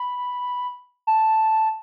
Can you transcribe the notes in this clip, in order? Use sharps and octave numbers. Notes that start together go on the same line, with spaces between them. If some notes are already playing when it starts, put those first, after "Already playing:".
Already playing: B5
A5